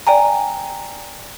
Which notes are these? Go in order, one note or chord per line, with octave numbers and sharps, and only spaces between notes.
D5 G5 G#5 A#5